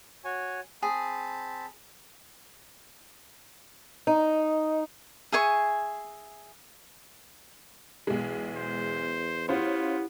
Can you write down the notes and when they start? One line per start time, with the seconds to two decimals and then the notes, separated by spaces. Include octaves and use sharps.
0.24 F#4 C#5 G#5
0.82 C4 G#4 A5 B5
4.07 D#4
5.32 G#4 E5 G#5 C#6
8.07 B1 E2 G#3
8.56 C5
9.49 B3 C#4 E4 F4 G4 C5 F#5